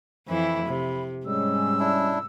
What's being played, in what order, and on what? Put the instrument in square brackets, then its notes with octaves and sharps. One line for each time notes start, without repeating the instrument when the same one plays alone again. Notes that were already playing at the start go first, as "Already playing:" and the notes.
[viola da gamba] F2 E3 E4 [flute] B5
[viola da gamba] C3
[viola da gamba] G#2 [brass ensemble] G3 G#3 C#4 [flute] E6
[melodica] D4 E4